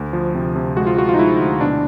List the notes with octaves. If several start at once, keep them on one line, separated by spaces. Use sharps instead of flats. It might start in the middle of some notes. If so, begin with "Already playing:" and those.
Already playing: D2
F3
C3
C3
G#3 F#4
F4
F3 F#4
F4
D#4
G#3 E4
D2
B2 D4